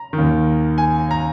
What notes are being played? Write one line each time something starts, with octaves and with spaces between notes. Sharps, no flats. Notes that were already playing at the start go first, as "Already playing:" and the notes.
Already playing: A#5
D#3
D#2
G#5
A#5